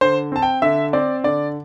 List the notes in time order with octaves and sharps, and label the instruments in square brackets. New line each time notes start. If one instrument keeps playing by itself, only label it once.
[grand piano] D3 C5
C4 A5
G5
D3 E5
C4 D5
D3 D5